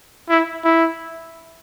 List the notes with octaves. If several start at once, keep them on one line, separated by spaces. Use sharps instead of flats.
E4
E4